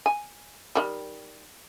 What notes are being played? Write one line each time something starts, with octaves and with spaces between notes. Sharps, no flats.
G#5
D#3 G3